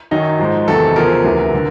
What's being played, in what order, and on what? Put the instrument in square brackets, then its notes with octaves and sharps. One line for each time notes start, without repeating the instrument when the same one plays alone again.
[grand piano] F#2 D#3 F#3 D#4
G#2 F3
E2 C3 D#3 F#3 A4
E2 C#3 F3 A#4
D2 C3 E3
D3